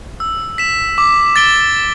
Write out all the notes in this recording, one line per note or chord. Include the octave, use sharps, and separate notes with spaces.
E6
B6 E7
D6
A6 D7 G7